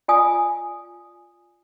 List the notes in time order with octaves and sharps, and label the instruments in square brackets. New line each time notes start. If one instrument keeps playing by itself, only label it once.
[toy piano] F4 D5 G#5 D#6